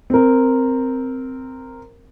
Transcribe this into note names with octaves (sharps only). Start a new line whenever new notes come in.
C4 A#4